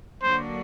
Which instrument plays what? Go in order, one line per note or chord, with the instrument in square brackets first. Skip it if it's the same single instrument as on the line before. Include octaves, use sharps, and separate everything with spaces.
[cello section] D3 F#3 A#3 D4 F#4 [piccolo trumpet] C5